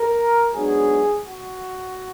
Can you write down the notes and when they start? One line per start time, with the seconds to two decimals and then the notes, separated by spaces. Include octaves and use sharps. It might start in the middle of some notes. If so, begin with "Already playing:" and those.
Already playing: A#4
0.54 G#2 F#3 B3 D4 G#4
1.23 F#4